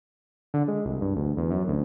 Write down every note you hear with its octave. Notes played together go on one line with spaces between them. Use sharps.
D3
G#3
C2
G2
D2
E2
F#2
D2